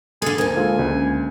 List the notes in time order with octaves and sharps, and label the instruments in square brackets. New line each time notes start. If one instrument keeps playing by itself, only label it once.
[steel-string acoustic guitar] D3 A4 [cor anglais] G#4
[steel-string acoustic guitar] D2 A#2 [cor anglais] G#5
[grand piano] G#3 F4 A4
C#2